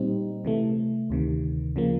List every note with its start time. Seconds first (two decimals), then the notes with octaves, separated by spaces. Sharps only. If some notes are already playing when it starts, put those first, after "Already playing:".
Already playing: A#2 G3 C4 D#4
0.45 C3 E3 A3
1.10 D2 C3 D#3
1.76 C#3 F3 A#3